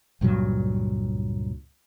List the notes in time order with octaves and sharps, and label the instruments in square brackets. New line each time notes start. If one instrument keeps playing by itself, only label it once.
[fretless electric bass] C#2 G2 A#2 F#3